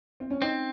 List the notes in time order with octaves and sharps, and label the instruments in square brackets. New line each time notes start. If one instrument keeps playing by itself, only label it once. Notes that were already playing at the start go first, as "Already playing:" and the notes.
[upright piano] C4
C#4
[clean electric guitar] C4 [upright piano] D#4